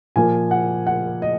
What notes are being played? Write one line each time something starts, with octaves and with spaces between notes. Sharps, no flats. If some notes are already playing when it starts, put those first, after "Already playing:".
A#2 F3 A#3 G#5
F#5
F#5
D#5